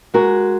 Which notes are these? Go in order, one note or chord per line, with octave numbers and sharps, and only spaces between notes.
G#3 F#4 A#4